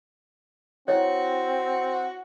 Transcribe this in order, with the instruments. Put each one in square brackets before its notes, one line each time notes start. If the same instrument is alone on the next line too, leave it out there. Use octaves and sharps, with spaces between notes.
[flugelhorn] C4 [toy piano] E4 C#5 [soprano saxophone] F#4